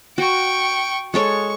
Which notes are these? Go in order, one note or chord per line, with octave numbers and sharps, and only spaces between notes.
F#4 G5 C#6
G#3 A4 C#5 C#6